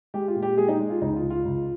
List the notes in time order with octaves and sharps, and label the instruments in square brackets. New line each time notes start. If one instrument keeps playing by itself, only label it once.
[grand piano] G#3 G4
F4
A#2
G4
G#3 G#4
D#4
G#3
F4
C#2 D#4
F4
C#2
F4
C#2